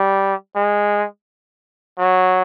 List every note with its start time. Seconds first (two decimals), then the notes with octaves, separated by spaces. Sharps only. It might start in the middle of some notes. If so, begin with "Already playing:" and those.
Already playing: G3
0.56 G#3
1.99 F#3